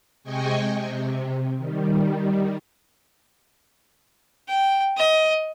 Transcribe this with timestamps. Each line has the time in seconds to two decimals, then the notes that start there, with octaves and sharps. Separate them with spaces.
0.24 C3 G#3 D#5 G5 G#5 C#6
0.74 C3
1.58 D#3 G3
4.48 G5
4.97 D#5